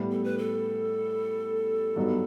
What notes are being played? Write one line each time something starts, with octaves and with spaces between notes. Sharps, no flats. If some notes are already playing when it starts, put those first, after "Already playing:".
Already playing: A2 G3 B3
A4
B4
A4
G2 F#3 B3 D#4